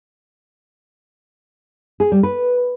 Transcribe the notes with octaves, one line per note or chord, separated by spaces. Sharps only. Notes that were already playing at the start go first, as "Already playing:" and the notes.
G#4
G3
B4